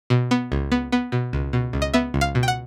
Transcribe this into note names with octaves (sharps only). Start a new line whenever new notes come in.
B2
B3
C#2
B3
B3
B2
C#2
B2
C#2
D#5
B3 E5
C#2
F5
B2
G5
F#5